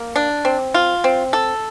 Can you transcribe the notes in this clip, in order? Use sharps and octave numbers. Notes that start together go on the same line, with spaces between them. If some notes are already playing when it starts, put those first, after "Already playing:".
Already playing: A#3
D4
C4
F4
C4
A4